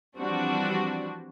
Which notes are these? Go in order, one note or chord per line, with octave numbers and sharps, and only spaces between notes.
E3 F3 G3 C4 D4 F#4